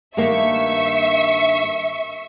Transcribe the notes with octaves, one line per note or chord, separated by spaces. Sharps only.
G2 D#3 A#3 E5 C#6